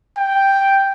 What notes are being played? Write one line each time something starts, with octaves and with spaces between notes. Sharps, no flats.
G5